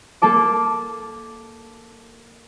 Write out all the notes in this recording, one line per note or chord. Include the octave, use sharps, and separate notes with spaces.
A#3 A4 A5 D6